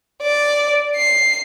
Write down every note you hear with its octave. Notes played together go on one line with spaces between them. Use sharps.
D5
C7